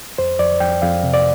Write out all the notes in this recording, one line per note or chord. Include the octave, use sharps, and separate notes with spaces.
F2 C5
F2 D5
F2 G5
F2 F5
C3
D5